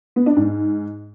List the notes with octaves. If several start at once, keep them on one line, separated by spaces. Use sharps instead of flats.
B3
D4
G#2